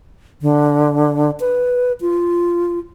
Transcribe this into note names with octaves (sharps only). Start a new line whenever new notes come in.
D3
B4
F4